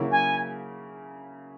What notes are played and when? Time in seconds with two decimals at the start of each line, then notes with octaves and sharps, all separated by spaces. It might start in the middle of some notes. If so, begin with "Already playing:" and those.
Already playing: C#3 F#3 A#3 C#4 E4
0.11 G#5